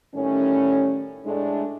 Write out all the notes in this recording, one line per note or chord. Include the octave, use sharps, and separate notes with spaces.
A2 D#3 G3 C#4
A2 G#3 A3 D4